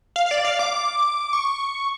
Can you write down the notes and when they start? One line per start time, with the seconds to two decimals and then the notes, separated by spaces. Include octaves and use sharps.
0.16 F5
0.26 F5
0.31 D5
0.45 F5
0.59 D6
1.33 C#6